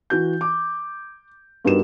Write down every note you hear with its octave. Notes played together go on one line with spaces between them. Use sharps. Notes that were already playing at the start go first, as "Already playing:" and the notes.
E3 F#4 G6
D6
G2 B3 D#4 F#4 A#4 E7